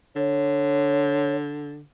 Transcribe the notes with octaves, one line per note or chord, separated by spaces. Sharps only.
D3 C#5